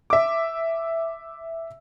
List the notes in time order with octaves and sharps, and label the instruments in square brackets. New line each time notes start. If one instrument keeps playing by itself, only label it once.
[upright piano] E5 D6